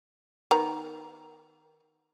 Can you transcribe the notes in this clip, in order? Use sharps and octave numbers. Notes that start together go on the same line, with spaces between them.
D#3 B3 A#5